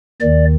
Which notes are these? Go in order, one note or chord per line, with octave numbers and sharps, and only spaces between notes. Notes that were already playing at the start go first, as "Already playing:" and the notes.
D#2 D#3 D5